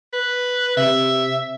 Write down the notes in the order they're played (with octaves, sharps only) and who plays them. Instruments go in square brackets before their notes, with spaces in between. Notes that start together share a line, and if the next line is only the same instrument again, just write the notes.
[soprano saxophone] B4
[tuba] C3 [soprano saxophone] E5